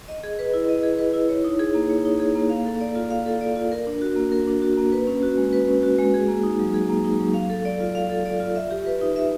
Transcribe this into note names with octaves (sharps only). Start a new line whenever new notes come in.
D#5
G#4
B4
E4
D#5
G#4
B4
E4
C#5
D#4
G#4
A#3
C#5
D#4
G#4
A#3
F5
A4
D5
F4
F5
A4
D5
F4
A#4
D4
F#4
A#3
A#4
D4
F#4
A#3
B4
C#4
F#4
G#3
B4
C#4
F#4
G#3
G#4
A#3
D#4
F#3
G#4
A#3
D#4
F#3
F5
A4
D5
F4
F5
A4
D5
F4
E5
G4
B4
D#4
E5